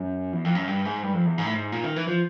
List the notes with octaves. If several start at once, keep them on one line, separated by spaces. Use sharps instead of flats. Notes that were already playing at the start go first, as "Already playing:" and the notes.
Already playing: F#2
E2
F2
F#2
G2
G#2
G2
F2
E2
G#2
A2
G#2
A#2
D#3
E3
F3